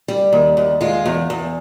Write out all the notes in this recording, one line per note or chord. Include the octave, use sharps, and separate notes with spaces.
G3
D#2
D#2
G#3 F4
E2
E2